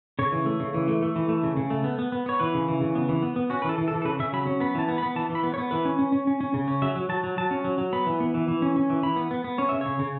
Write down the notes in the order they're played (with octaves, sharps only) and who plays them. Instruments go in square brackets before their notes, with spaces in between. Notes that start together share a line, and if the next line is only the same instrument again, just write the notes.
[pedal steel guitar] C#3 C#5
E3
A3
C#3
E3
A3
A3
E3
A3
C#3
C#3
A3
B3
B3
B3
B3 C#5
E3 B4
C#3
E3
C#3
B3
E3
B3
B3
C#4 F#4
E3 B4
A4
E3
A4
E3
A4
C#3 B4
C#3 E5
F#3 B5
C#4
B3 B5
E3 A5
B3
B5
B3
E3 A5
E3
B5
B3
C#5
B3
E3 B4
C#4
C#4
C#4
C#4
C#4
C#3
C#4
F#3 E5
F#3
F#3 A5
F#3
F#3 A5
C#4
F#3
F#3
B3 B5
E3
B3
E3
E3
C#4
C#4
E3
E3 B5
B3
B3
B3
C#4 C#5
C#3 E5
C#3 C#5
C#3